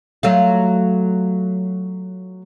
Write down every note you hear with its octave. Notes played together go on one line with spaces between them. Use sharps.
F#3 A3 F4